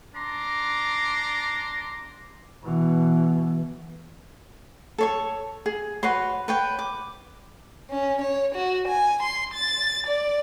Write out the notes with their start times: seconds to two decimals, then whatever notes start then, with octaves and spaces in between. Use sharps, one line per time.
0.15 D4 A#5 C6 D6
2.64 B2 E3
4.98 A4 C#5 C#6
5.66 G#4
6.03 F#4 B4 C#5 C6
6.48 B4 C#5 G5
6.79 D6
7.90 C#4
8.21 C#5
8.55 F#4
8.88 G#5
9.23 C6
9.54 A6
10.07 D5